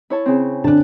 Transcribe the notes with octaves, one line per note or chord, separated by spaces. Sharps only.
E4 C#5 A5
C#3 C4
D3 D4 A5 F#6